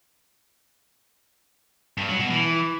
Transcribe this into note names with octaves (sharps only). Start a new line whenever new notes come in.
G2
F#3
B2
E3